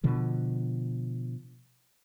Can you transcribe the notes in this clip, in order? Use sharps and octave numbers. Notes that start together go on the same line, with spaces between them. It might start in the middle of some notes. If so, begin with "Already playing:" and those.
B2 D3 F3